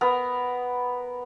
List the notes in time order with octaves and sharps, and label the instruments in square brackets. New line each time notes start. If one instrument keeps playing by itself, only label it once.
[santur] B3 A#4